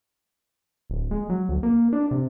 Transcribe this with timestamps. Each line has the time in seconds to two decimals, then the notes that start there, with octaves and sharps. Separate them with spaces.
0.90 D1
1.11 G#3
1.30 F#3
1.49 D2
1.63 A#3
1.93 D4
2.11 C3